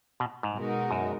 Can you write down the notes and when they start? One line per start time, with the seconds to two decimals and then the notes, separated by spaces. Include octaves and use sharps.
0.20 B2
0.43 G#2
0.55 B2 G#3 D#4 F#4 A#4
0.91 F#2